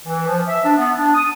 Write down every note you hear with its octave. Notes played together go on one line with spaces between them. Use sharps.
E3
F3
E5
D4
B3
D4
D#6